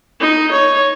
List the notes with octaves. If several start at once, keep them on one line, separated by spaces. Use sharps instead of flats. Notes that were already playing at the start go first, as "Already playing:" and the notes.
D#4
C#5